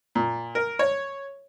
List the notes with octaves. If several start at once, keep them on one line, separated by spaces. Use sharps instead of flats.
A#2
A#4
C#5